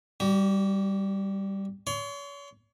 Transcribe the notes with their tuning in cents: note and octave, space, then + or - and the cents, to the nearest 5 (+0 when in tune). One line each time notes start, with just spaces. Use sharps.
G3 +0 F#4 +45
C#5 +40 C6 +0